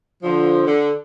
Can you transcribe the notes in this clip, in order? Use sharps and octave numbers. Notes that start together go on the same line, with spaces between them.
D3 F3
D3